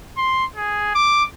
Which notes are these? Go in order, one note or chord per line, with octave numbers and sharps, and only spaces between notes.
C6
G#4
D6